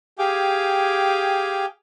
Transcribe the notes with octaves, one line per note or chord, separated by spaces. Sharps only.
G4 G#4 F5 G5 G#5 D6